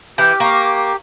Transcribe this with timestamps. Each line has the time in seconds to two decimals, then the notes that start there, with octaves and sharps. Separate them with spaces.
0.18 E3 G4 D6 F6 G6
0.40 A#3 C#6 F6